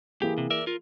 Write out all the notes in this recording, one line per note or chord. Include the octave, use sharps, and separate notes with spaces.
E3 A#3 G4 G#4
C3
A#4 D5 E5
F4 A#4